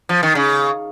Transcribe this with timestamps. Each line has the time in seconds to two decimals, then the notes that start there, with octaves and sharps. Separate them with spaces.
0.09 F3
0.23 D#3
0.35 C#3